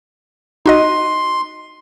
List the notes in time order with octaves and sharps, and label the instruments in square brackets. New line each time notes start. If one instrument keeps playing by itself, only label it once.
[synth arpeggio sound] D#4 F#4 D#5 [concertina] C6